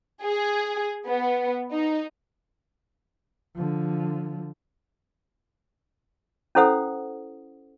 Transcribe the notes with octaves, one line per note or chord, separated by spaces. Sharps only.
G#4
B3
D#4
D3 F3
C#4 E4 A4 C5 F#5 D#6